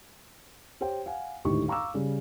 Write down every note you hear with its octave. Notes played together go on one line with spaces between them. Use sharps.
G4 C5 C#5 G5
F5 F#5 G#5
G#1 D2 A2 D#3 G4 C#6
F5 A#5 C#6 D6 E6
C#3 G3